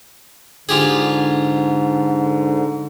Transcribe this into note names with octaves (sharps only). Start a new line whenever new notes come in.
G#2 D3 F4 G4 G#4